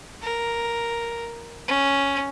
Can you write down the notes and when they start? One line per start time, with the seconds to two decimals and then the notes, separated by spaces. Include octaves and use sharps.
0.22 A#4
1.68 C#4